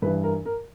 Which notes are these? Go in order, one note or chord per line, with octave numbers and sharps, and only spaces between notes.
G2 E3 B4
A#4
A#4